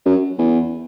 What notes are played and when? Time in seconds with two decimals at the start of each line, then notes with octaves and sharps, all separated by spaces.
0.05 F#2
0.38 E2